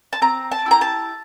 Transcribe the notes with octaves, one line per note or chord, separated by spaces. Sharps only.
A5
C4 A#5
A5
E4 G4 A#5
A5